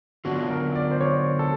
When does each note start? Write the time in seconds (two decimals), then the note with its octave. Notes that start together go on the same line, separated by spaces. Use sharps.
0.25 D3 F#3 B3 D4 F4 F#4
0.50 A#4
0.75 D5
0.91 C5
1.01 C#5
1.39 A4